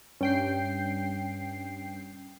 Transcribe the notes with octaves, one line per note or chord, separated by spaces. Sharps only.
G2 C#4 G5 C7